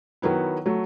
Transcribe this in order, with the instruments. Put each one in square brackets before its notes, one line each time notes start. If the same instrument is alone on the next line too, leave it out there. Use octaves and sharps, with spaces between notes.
[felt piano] D#3 F#3 B3 E4
F#3 A3